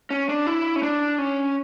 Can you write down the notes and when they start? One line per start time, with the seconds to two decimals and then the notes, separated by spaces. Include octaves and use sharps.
0.10 C#4
0.29 D4
0.46 E4
0.76 C#4
0.83 D4
1.18 C#4